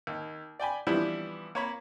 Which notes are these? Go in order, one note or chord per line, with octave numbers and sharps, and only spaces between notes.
D#2
D5 G5 G#5 B5
E3 F3 G3 B3 D4 E4
A#3 C#5 B5